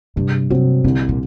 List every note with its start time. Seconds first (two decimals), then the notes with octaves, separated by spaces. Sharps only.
0.16 G2 C3
0.50 C3 F#3 C4
0.84 C2 D3
1.09 A#2